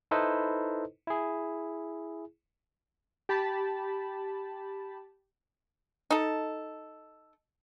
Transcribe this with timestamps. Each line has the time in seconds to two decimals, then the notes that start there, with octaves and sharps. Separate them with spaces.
0.11 D#4 E4 A4 B4 C5 D#5
1.07 E4 G#4
3.29 G4 A5 B5
6.11 D#4 A4